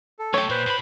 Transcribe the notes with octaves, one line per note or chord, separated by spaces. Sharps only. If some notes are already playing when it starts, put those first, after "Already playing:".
A4
B1 A3 G4 C#5
A#2 B4 C5
A2 B5